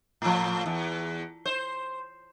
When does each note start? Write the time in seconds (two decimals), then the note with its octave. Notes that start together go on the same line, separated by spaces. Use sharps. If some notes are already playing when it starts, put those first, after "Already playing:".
0.22 A2 F3
0.66 E2
1.46 C5